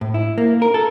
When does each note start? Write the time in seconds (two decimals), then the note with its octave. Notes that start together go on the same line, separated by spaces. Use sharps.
0.01 A2
0.14 E4
0.38 A#3
0.62 A#4
0.74 A4